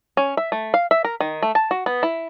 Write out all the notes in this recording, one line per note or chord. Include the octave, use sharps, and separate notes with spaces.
C#4
E5
A3
F5
E5
A#4
D#3
A3
A5
F#4
B3
E4